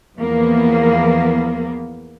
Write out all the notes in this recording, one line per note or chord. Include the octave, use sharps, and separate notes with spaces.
E2 F3 A#3 B3